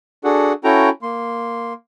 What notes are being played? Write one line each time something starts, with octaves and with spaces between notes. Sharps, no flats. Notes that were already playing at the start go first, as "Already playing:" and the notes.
D4 F#4 G#4 A4 F#5
C#4 E4 F#4 A4 G5 A#5
A#3 C6